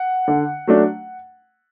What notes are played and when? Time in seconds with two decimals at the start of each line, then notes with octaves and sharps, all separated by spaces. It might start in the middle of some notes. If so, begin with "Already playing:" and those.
Already playing: F#5
0.28 D3
0.67 F#3 A3 D4